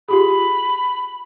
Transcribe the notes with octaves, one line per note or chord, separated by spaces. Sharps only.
F4 G4 G#4 B5